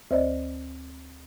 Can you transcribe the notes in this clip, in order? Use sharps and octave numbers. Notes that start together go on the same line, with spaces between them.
D2 C5 D5 D#5